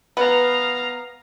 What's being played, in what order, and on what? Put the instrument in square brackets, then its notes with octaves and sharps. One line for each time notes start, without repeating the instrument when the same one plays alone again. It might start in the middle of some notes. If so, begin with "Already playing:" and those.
[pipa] B3 [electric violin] F5 A#5